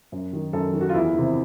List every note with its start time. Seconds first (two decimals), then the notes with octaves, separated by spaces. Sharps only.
0.12 F#2
0.33 D#3
0.53 F#2 A4
0.73 D#3
0.81 F#4
0.89 F4
0.94 E2 E4
1.14 C3 D#3